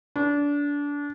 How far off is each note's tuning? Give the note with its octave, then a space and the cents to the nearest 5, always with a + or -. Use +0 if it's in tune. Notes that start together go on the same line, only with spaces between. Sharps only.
D4 -25